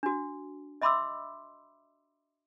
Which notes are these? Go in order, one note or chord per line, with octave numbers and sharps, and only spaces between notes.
D4 F#4
D#5 E5 B5 C6 D6 E6